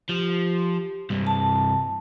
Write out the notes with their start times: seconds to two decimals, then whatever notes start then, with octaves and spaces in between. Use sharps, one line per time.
0.09 F3 G4
1.10 C2 G2
1.27 A5